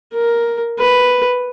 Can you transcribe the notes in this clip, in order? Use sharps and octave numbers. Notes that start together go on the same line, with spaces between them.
A#4
B4